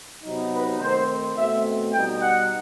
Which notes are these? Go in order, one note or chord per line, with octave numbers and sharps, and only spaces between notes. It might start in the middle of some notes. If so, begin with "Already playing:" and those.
C3 F#3 B3 D#4
B4
D#3 A3 C4 C5
B2 A3 C4 E5
B2 G3 D#4 G5
F#5